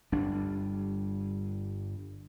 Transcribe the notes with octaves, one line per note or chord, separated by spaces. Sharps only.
G1 G3 D4